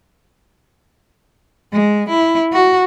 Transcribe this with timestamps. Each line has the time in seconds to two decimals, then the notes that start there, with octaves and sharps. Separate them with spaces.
1.73 G#3
2.09 E4
2.53 F#4